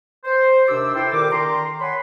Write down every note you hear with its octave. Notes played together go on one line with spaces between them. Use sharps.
C5
D#2 C3 D4 G4 D6 E6
E4 A4 C5 G5
A#2 D#3 G4 A#4 G5 D6
D3 D#3 G5 A#5 C6
C#5 F#5 G#5 B5 C6